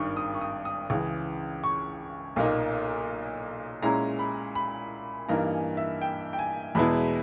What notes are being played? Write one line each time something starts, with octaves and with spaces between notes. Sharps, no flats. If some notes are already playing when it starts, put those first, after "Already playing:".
Already playing: G#1 G2 D#3 C#6
D#6
C#6
D#6
D#6
C#2 C#3 E3
C#6
B1 A#2 A#3 D#4
A#2 G#3 C#4 E4 A#5
B5
B5
G2 E3 A#3 D#4 A#5
G#5
E5
G5
G5
G#5
E2 B2 G#3 B3 E4 B5